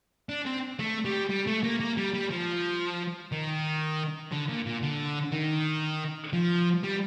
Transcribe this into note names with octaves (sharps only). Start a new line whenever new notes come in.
D4
C4
A3
G3
G3
A3
A#3
A#3
G3
G3
F3
D#3
D3
A#2
A#2
D3
D#3
F3
G3